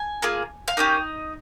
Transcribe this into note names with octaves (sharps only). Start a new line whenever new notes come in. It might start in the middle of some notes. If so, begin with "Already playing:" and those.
Already playing: G#5
A#3 F4 G#4
F5
A#3 C#4 D#4 G4 D#5